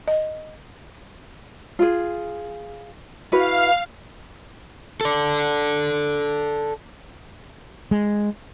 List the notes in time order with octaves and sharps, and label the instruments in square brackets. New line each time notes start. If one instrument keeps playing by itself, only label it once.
[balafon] D#5
[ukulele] F4 G#4
[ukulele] E4 F#4 B4 [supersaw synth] F5
[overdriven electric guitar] A4 D5
[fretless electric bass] G#3